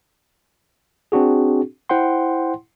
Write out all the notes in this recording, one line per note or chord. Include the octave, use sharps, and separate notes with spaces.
C4 D4 F#4 G#4
E4 C5 F#5 G5 C6